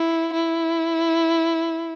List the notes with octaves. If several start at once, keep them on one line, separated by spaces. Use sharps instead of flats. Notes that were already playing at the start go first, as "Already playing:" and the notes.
Already playing: E4
E4